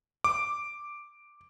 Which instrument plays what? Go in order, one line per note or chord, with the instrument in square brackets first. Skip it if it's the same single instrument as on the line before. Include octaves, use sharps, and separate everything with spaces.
[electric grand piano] D6